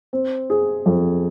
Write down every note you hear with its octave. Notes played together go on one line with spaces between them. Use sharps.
C4
G#4
F2